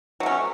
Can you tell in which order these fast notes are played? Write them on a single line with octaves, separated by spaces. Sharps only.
F#3 A3 C#4